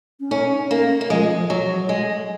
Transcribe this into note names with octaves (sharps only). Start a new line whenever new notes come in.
C#4
C#4 D#4
A#3 C#4
A#3
F3 G#3
F3
F#3
F#3
G#3